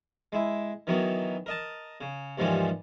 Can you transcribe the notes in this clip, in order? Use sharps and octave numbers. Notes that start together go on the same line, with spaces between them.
G#3 E4
D#3 E3 F#3 B3
A#4 D#5 A5
C#3
D#2 G#2 E3 F3 G3 C#4